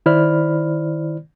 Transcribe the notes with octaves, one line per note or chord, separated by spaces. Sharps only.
D#3 E4 C5 D5 B5 F6